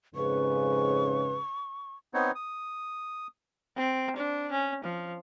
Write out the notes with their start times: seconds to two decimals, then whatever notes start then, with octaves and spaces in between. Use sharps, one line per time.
0.15 F2 G#2 C#3 B4 C#6
2.14 B3 C4 D#4 C#5
2.35 D#6
3.77 C4
4.16 D4
4.52 C#4
4.85 F3